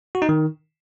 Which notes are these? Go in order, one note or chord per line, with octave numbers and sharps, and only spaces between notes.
F#4
D#4
D#3